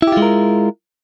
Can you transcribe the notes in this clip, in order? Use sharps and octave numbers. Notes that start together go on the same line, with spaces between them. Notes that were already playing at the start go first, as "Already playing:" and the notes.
G#3 E4 F4 G4 A#4